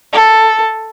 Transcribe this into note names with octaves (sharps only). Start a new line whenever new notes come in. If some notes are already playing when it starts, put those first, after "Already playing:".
A4